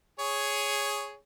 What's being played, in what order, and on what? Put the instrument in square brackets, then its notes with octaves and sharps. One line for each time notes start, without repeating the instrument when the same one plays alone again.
[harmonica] G#4 C#5